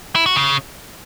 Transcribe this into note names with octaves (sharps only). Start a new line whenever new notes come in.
E4
F#4
C#3